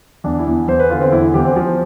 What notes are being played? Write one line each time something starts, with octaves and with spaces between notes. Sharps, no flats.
E2 D4
E4
E2
E2 C5
B4
D3 F4
C4
E2 E4
E2 G4
C4
F3